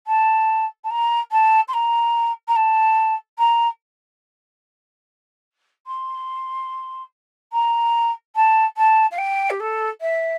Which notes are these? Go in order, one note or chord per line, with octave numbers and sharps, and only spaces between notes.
A5
A5
A#5
A5
C6
A#5
A#5
A5
A#5
C6
A#5
A5
A5
F5
G5
G4
A4
E5